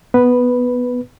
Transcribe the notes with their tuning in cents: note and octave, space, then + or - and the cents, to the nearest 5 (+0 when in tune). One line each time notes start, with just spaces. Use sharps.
B3 +0 B4 +0